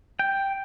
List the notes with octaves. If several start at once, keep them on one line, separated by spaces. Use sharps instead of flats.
G5